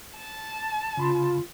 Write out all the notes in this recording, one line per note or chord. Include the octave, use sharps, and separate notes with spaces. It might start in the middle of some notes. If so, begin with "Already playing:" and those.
A5
C#3 F4 B5 C6